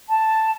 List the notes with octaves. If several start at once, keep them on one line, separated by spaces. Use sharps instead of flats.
A5